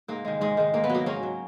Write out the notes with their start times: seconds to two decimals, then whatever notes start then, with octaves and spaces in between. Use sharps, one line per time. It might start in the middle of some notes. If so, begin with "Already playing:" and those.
0.08 G#2 A#3
0.25 D#3 G#3
0.41 G#2 G#3
0.57 D#3 G#3
0.74 G#2 A#3
0.84 B3
0.89 F#3
0.95 A#3
1.06 G#2 A#3 C#4
1.23 F#3